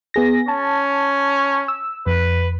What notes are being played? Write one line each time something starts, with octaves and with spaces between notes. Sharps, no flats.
B3 G#4 A#6
C#4 A5
E6
F2 B4